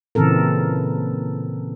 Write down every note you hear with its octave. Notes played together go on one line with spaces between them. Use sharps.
A#2 C#3 E3 C4 A4 A#4